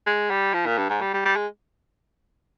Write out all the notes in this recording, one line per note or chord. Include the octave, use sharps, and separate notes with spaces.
G#3
G3
F3
A#2
G2
G#2
G3
G3
G3
G#3